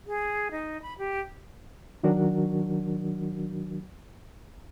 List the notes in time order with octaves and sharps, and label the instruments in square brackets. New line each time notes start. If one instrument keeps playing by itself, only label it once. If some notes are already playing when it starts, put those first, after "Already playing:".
[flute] G#4
D#4
B5
G4
[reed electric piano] D#3 F#3 D4 F#4 A#4